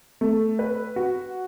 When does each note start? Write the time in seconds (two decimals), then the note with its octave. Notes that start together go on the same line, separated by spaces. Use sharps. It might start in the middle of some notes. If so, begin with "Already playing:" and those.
0.21 A3
0.59 B4
0.96 F#4